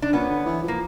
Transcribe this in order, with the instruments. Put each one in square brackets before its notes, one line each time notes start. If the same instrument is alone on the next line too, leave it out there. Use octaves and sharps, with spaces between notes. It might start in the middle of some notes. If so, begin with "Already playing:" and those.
[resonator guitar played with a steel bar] D4
[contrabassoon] A#2 [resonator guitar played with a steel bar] B3 C#4
[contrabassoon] D3
E3
F3
[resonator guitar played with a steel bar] A#3